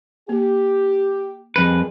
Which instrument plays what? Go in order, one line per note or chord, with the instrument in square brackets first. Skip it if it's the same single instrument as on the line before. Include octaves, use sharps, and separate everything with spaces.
[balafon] A#3 [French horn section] G4
[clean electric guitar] F2 B4 [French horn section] A#2 G3 G#3